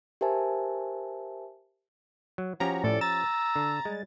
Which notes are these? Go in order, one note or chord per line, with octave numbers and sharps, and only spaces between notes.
G4 A#4 C5 E5 G#5 A5
F#3
F3 C#4 F#4 G4 A#5
A2 A4 D5
A#5 E6 A6
D3 A5
G3 G#3